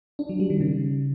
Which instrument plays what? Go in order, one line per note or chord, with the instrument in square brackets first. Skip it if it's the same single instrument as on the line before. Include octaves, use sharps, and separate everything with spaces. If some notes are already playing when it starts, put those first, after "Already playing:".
[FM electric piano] D4
F#3
G3
D#3
C#3